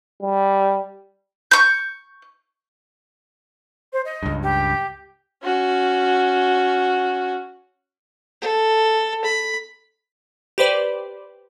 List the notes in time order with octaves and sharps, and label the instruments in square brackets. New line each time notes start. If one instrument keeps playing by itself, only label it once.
[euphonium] G3
[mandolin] C#6 G6
[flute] C5
D#5
[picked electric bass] C#2 G2
[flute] G4
[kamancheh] C#4 F#4
[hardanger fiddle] A4
B5
[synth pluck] G4 B4 C5 D5